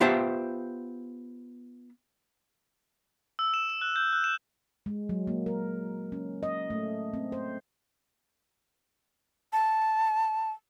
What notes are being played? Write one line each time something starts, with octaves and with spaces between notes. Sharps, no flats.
B3 F4 G4 C5 E5 A5
E6
E7
E7
F#6
G6
F#6
E7
G#3
F#3
A#3
A#4
C#4
D#5
A3
C4
C5
A5